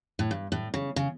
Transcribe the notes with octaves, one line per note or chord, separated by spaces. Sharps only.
A2
G2
A2
C#3
C#3